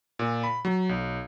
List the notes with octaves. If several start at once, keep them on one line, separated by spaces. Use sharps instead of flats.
A#2
B5
F#3
B1